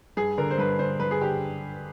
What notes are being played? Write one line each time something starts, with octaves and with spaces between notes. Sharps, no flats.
G2 G#4
D3 A#4
C5
G2 B4
D3 C5
G2 B4
G#4
D3 G4